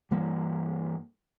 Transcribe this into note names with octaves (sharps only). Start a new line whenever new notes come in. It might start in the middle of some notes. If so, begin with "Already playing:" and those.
G2 E3 G3 A#3